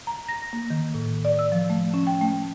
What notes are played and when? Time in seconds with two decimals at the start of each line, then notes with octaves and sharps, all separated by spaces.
0.07 A#5
0.29 A#6
0.53 A#3
0.70 D#3
0.94 A2
1.25 D5
1.39 E6
1.52 F3
1.70 A3
1.94 C#4
2.07 G5
2.21 A3